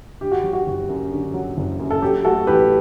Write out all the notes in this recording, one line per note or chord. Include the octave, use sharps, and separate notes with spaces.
D3 G4
F#4
F#3
F#4
F#1
F#2
D3
F#3
F#1
F#2
A4
F#3 G4
A3 F#4 A4
A1 G4 B4